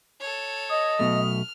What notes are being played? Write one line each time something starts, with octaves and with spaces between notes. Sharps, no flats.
A4 C#5
D#5 D#6
B1 B2 A3 F6